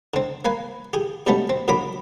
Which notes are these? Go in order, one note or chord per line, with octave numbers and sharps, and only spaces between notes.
D3 C4
A#3 B4 G#5
G4 G#4
B2 D3 G3 A3 B3 C#4
C4
A#2 D3 F#3 B5 D6